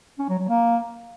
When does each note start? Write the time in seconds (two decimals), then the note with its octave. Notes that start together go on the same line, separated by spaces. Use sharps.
0.19 C#4
0.29 F#3
0.39 F#3
0.49 A#3